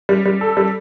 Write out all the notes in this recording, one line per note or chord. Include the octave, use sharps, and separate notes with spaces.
G3
G3
A4
G3